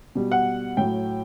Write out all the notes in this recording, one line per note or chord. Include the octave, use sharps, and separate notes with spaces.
B2 G3
F#5
A2 F#3 G5